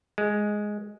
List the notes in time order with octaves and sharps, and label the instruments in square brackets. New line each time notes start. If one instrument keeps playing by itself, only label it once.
[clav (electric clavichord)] G#3